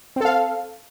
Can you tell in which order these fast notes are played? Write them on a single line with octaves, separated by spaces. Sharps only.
C4 A4 F5